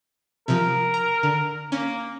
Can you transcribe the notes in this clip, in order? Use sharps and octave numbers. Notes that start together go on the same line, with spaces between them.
C3 F3 A#4
A#5
D3
A#3 C#4